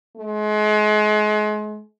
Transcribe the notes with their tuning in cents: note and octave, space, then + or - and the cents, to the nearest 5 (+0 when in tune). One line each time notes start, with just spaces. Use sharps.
G#3 +35